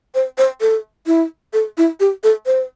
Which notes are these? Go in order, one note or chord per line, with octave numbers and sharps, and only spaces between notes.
C5
C5
A4
E4
A4
E4
G4
A4
C5